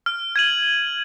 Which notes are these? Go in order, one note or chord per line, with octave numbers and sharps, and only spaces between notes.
F6
G#6 D#7 F#7